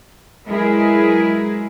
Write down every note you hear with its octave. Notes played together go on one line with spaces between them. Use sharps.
F#3 G#3 E4 G#4 A#4 B4